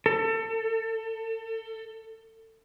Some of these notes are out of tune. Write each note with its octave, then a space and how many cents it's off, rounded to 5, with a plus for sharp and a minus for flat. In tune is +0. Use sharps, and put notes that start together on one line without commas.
A4 +30